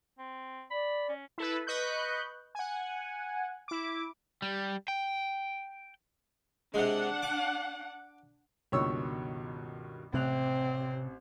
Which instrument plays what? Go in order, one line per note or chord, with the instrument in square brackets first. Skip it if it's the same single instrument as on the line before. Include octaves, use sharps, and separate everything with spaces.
[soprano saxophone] C4
[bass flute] D5 [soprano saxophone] B5
[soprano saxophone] C#4
[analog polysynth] E4 A4 B4
B4 D#5 C#6 F#6 G6
F#5 G#5
E4 D6
[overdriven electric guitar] G3
G5
[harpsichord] C3 G#3 [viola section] D4 F#5
[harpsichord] D6
[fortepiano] C#2 C#5 E6 [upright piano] G2 B2 D#3
[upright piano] A1 F#6 F7 [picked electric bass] C3 [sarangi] C4